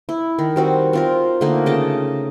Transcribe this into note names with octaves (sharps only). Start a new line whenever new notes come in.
E4
D#3
G3 C4 F#4
C4 F4 A#4
D3 A3 A#3 D#4
C#3 D#5 G5 A5